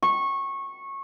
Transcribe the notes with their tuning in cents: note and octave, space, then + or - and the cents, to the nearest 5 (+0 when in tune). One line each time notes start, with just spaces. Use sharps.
C#6 -20